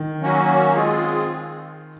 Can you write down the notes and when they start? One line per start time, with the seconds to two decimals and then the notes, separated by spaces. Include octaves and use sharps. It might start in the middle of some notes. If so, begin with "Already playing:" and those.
Already playing: D#3
0.21 F#3 A#3 C#4 F#4
0.74 G#3 C4 F4 G#4